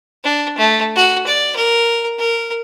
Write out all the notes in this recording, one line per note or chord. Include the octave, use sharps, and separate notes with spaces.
D4
A3
F#4
D5
A#4
A#4